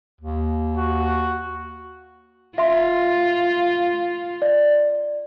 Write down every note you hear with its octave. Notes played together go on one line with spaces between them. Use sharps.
D#2
F#4
F4 E5 C6
D5